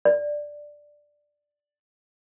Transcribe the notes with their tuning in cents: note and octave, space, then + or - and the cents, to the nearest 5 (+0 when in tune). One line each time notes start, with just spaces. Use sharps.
D5 +5